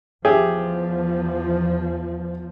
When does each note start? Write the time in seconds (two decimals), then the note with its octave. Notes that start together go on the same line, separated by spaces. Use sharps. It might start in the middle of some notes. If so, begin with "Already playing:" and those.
0.25 E2 F3 G4 G#4 E5